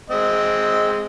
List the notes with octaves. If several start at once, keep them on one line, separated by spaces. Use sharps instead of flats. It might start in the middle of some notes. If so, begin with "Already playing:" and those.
G#3 C4 D#5